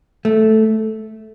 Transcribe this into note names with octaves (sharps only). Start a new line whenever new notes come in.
A3